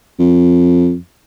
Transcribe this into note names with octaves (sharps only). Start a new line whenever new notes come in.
F2